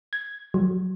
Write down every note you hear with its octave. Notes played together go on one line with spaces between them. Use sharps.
G#6
F#3